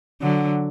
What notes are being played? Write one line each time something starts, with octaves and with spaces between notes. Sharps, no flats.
D3 F#3